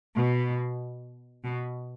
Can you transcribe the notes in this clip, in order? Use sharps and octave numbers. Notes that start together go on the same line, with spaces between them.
B2
B2